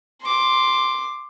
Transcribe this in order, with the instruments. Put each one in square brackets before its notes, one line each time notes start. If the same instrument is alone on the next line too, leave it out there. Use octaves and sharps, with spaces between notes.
[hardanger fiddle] C6 D6